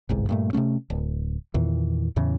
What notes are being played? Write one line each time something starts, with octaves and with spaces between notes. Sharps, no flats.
G1 C2 G#2
G2 A#2 A3
C3 E3 A3 C#4
D1
E2 A#2 D#3 E3
E2 A2 C#3 E3